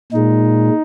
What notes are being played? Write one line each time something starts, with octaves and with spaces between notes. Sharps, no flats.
A#2 G#3 D#4